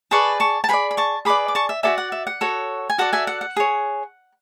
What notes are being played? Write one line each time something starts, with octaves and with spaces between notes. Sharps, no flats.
G#4 B4 D5 A5 C#6
A5 C#6
A5
G#4 B4 D5 G#5 B5
B5
A5 C#6
G#4 B4 D5 B5 D6
D6
A5 C#6
E5
F#4 A4 D5 E5 G#5
F#5
E5
F#5
F#4 A4 C#5
G#5
F#4 A4 D5 F#5 A5
E5 G#5
F#5
F#5
G#4 C#5